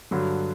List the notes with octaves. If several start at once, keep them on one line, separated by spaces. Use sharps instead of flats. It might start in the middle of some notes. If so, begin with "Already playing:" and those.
G2 D3 F#3